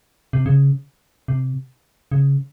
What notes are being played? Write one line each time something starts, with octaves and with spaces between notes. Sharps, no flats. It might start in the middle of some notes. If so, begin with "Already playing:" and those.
C3
C#3
C3
C#3